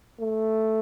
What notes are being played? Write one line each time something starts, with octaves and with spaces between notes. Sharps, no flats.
A3